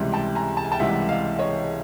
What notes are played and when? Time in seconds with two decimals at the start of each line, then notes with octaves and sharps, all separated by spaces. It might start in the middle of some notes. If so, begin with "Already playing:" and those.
Already playing: C#2 C3 E3 G3
0.13 G5 A5
0.35 G#5 A#5
0.57 A5
0.65 G#5
0.72 G5 A5
0.79 C#2 C3 E3 G3 E5 F#5
1.09 D#5 F5
1.39 C#5 D#5